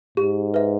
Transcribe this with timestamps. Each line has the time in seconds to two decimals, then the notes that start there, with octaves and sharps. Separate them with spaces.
0.17 G#2 G4
0.54 B4 E5